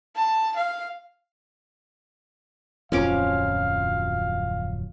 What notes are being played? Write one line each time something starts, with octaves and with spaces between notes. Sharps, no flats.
A5
F5
D1 F2 F3 F#3 C#4 F5 D6